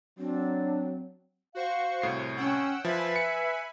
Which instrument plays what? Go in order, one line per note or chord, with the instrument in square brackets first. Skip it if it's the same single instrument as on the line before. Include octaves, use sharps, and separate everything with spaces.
[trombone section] F#3 [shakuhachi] C4 [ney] D4
[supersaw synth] F#4 C5 C#6 [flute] F5
[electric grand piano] C2 A2 C7
[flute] C#4 [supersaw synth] F#5 G5 E6
[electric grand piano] F3 [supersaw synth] B4 G#5 B5 [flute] E5
[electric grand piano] C#7